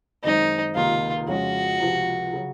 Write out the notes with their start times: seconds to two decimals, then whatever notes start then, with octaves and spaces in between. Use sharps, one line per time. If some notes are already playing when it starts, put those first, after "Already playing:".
0.24 F#2 D#3 G#3 C4 D#4
0.75 C#2 C3 D#3 A#3 D#4 F4
1.28 F2 C#3 G#3 C#4 F4 F#4
1.80 C#2 C3 F3
2.33 C#3 F#3 C#4